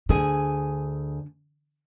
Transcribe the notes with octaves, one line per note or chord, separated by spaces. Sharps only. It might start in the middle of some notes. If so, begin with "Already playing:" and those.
D2 D3 G#4 G#5